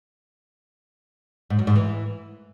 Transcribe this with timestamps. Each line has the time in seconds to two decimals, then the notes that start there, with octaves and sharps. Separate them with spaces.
1.50 G#2
1.59 F#2
1.67 G#2
1.76 E3